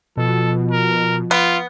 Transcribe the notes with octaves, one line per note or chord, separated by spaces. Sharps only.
B2 F3 A4
A#4
B3 F4